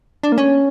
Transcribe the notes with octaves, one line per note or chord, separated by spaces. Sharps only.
D4
A#3
C#4